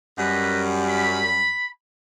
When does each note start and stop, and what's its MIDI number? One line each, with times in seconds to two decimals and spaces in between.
0.19 1.53 42
0.19 1.53 55
0.19 0.62 71
0.19 0.62 75
0.90 1.69 83